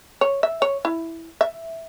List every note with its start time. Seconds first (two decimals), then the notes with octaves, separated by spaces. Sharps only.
0.21 C#5
0.43 E5
0.62 C#5
0.85 E4
1.41 E5